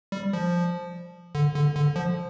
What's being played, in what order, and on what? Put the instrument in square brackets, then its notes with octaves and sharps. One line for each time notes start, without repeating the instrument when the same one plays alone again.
[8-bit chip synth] G3
F3
D3
D3
D3
F3